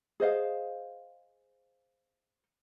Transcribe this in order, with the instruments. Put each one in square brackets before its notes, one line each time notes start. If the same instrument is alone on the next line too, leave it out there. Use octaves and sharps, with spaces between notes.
[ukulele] G#4 C5 D#5 F5